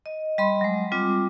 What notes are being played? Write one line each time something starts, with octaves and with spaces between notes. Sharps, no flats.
D#5
G3 D#5 B5 C6
F#3 G#3
G3 C4 F4 D6